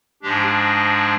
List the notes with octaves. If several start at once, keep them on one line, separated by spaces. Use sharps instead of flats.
G#2 F3 G#3 D4 G4